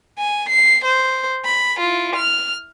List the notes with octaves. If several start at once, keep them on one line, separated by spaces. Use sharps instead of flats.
G#5
C7
C5
B5
E4 F4
F6